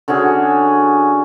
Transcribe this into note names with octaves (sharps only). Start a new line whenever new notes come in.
D3 C#4 F#4 G#4